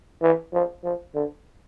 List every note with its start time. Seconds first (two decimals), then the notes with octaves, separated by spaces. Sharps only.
0.22 E3
0.53 F3
0.84 F3
1.15 D3